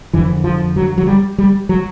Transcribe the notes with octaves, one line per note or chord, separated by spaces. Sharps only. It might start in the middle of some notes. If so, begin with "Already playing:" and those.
F2 D3 E3
F3
F#3
F#3
G3
G3
F#3